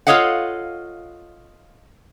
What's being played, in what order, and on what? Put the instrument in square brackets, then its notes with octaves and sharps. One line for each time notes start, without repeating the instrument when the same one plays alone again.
[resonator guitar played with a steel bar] F4 A4 C#5 D#5 F5 F#5